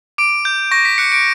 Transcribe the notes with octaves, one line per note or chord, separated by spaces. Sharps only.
D6 D7
G6
C#6 A#6
B6
F#6 C#7
D7